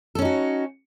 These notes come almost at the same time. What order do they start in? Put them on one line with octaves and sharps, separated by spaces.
A4 C#4 D#4 F#4